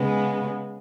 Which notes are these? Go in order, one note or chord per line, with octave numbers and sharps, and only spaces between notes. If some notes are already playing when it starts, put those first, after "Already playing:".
Already playing: C#3 G#3 B3